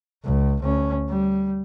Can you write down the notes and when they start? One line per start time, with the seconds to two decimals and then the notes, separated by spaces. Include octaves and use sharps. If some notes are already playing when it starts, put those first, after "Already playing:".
0.24 C#2
0.63 D2 C#4
1.10 G3